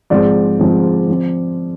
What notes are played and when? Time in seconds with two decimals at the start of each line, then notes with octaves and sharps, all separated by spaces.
0.10 G#2 F3 G#3 C4 D5
0.59 G#2 F3 G#3 C4
1.09 F3 C4